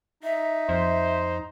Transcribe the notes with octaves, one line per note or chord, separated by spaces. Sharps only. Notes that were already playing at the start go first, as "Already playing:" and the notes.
D#4 E5
F2 C5